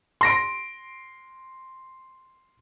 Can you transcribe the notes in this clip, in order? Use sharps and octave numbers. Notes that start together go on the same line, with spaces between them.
C6 A#6 D7